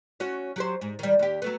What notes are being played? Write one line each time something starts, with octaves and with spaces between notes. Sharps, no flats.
C#4 F#4
F#3 G4 C5
G#2
D#3 G3
D#2 G4
F#3 A3 B3